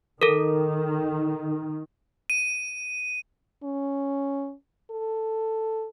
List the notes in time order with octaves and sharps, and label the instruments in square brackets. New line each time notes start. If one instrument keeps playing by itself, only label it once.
[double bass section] D#3 [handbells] A4 A#4
[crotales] D#7
[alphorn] C#4
A4